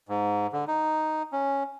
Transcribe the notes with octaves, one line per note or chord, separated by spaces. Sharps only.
G#2
D3
D#4
C#4